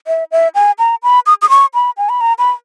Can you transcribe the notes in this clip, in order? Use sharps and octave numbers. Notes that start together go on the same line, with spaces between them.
E5
E5
G#5
A#5
B5
D#6
D#6
C#6
B5
G#5
B5
A#5
B5